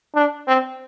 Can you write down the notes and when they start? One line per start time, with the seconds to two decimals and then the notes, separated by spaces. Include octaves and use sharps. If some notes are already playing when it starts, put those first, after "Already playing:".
0.15 D4
0.48 C4